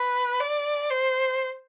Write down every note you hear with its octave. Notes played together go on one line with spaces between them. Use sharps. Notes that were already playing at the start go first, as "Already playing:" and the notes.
Already playing: B4
D5
C5